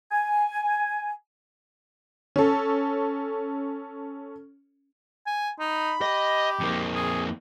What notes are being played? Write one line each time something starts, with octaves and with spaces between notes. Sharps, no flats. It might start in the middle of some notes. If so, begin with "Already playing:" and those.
G#5
C#4 A4
G#5
D#4 B5
G4 D#5
F2 A#3
G#4